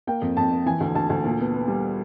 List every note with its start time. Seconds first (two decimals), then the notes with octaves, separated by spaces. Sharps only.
0.07 A#3 G5
0.22 F2
0.37 F2 A5
0.51 A#3
0.66 E3 G#5
0.80 D2
0.95 D2 A5
1.10 D2
1.24 A#2
1.39 B3
1.54 B3
1.68 G3